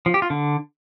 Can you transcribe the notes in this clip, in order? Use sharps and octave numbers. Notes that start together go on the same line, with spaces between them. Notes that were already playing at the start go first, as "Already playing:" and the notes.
F3
G4
F4
D3